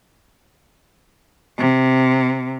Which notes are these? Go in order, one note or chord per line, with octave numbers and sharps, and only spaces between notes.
C3